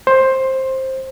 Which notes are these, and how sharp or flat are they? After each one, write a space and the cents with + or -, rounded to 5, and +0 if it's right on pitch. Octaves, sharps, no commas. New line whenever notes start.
C5 +15